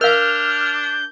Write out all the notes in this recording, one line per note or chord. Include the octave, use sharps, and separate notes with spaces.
D4 A#4 F5 F6 G6